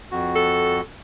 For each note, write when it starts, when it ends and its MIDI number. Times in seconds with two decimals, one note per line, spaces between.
0.11 0.81 41
0.11 0.81 66
0.35 0.81 69